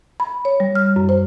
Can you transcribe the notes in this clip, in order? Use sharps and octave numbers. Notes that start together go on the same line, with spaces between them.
B5
C#5
G3
F6
F#2
C5